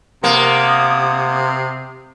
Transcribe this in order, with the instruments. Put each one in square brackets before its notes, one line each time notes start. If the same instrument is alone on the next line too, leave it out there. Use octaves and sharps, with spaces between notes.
[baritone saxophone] C3 [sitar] A#3 B3 [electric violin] D#6